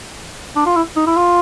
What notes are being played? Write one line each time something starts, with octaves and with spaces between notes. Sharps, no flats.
D4
F4
E4
D#4
E4
F4